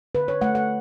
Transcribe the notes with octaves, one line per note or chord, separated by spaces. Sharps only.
D3 B4
C#5
A3 F#5
F#5